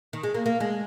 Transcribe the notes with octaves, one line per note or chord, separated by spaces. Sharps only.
D#3
G#3
A#3
A#3
G#3